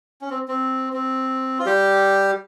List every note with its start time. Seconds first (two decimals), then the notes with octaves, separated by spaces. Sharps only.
0.21 C#4
0.30 C4
0.48 C4
0.93 C4
1.59 F4
1.66 G3 G4